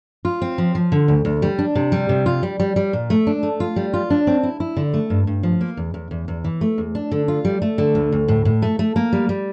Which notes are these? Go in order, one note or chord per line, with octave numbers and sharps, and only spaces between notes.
F4
C4
F3
F3
D3
D2
D2
G3
D4
C3
G3
C3
F4
G3
G3
G3
A#2
A3
D4
A3
F4
G3
F4
D4
C4
E4
E4
D3
A3
G2
G2
F3
A#3
E2
E2
E2
E2
E3
A3
E2
D4
D3
F4
G3
A3
D3
D2
D2
A2
A2
A3
A3
A#3
G3
G3